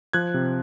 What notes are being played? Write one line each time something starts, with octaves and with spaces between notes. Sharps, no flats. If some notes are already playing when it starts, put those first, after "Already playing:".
F3 F#6 G#6
C3